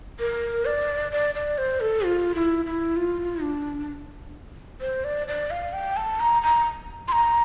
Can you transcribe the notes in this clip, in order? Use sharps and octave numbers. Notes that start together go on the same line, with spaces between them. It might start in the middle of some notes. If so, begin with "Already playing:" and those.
A#4
D5
D5
D5
C5
A4
F4
E4
E4
F4
D4
C5
D5
D5
F5
G5
A5
A#5
A#5
C6
A#5